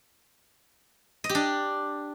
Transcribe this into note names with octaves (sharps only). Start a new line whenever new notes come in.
D#5
G4
D4